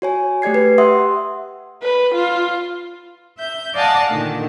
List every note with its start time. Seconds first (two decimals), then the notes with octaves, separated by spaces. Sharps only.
0.02 F#4 C#5 G#5
0.42 A3 G4 D5 G#6 C7
0.54 B4
0.78 G4 E5 F#5 C6 D#6
1.82 B4
2.14 F4
3.37 E5 G6
3.74 D5 D#5 F5 F#5 G#5 A5
4.09 A#2 D3 D#3